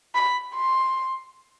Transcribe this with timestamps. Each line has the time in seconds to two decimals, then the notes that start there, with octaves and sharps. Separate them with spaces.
0.15 B5
0.55 C6